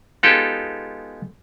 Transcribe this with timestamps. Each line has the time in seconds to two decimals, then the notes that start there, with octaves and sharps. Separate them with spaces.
0.23 G#3 B3 D#4 F4 G4 A4